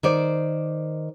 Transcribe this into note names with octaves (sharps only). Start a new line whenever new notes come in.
D#3 C5 D5